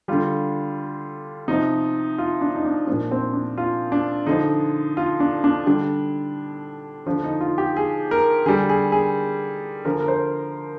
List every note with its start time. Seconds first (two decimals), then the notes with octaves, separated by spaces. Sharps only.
0.08 D3 G3 F4
1.48 C3 F3 D#4
2.18 F4
2.41 D4
2.55 D#4
2.65 D4
2.87 F3 D4
2.91 A#2
3.11 C4
3.34 D4
3.58 F4
3.92 D4
4.26 D3 F3 D#4
4.97 F4
5.20 D4
5.44 D4
5.66 D3 G3 D4
7.06 F3 D4
7.11 D3
7.24 D#4
7.41 F4
7.58 G4
7.76 G#4
8.11 A#4
8.46 D3 G3 G#4
8.69 G#4
8.92 G#4
9.85 D3 F3 A#4
10.00 A#4
10.08 C5